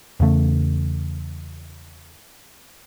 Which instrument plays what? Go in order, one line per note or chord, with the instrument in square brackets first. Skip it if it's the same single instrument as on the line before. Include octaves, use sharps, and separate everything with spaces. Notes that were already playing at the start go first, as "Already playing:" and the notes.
[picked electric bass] E2 C#3 A3